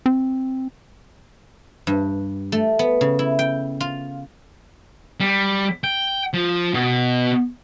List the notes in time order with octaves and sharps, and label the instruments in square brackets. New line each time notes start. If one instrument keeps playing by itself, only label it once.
[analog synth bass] C4
[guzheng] G2
A3
B3
C#3
E4
G5
F4
[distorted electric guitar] G3
G5
F3
B2